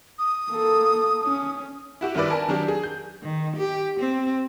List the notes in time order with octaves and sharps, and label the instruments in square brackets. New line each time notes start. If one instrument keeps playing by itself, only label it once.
[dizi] D#6
[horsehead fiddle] A#3 A4
C#4
[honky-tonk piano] E4 F#4 G4
G1 D#3 E4 B4 D5
A#4 G#5 A5
D#3 F#3 D4 G4
G#4
G6
[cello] D#3
G4
C4